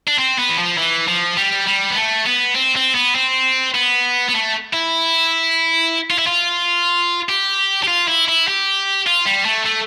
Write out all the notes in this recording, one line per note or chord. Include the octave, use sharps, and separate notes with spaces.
D4
C4
B3
E3
F3
E3
F3
G3
G3
B3
A3
B3
C4
C4
B3
C4
B3
B3
A3
E4
F4
E4
F4
G4
G4
F4
E4
E4
G4
F4
G3
A3
A3